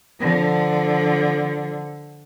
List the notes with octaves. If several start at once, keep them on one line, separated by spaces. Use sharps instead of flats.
D3 F3